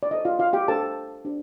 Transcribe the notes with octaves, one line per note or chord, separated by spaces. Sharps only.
D5
F4 A4 C5 D#5
F4 F5
F4 F5
G4 G5
D4 G4 A4 C5 A5
D4 G4 C5